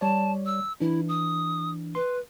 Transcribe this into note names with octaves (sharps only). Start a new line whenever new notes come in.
G3 C#5 D5 A5
E6
E3 D4 E4
D#6
B4 C6